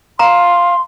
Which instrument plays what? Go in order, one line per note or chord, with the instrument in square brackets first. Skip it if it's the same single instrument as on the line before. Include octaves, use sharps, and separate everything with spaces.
[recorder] F5 [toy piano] A#5 [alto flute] C6